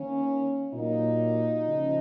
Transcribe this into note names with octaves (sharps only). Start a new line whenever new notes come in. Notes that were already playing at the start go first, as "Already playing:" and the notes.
Already playing: D#3 A#3 C#4
A#2 F#3 A#3 D#4
C#3 F3